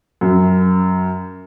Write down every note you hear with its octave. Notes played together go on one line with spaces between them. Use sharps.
F#2